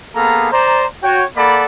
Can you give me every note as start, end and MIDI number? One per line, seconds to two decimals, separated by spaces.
0.16 0.49 58
0.16 0.49 59
0.16 0.49 68
0.16 0.49 69
0.16 0.49 77
0.16 0.49 82
0.52 0.85 72
0.52 0.85 74
0.52 0.85 82
1.03 1.24 66
1.03 1.24 73
1.03 1.24 79
1.36 1.65 58
1.36 1.65 69
1.36 1.65 74
1.36 1.65 78
1.36 1.65 83